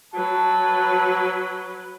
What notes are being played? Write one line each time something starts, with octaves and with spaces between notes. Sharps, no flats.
F#3 B4 A5